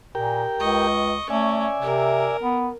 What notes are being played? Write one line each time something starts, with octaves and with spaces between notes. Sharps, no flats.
A#2 G4 A#4 G5
C#2 D#5 C#6
A3 C#4 D5 E5 G#5
C3 A#4
B3